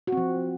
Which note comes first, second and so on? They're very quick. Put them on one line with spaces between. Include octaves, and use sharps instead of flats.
F#4 C4 F3